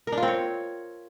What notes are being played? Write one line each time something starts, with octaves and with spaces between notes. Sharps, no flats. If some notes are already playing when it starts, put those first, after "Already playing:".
A#4
D4
F4
C4
C#5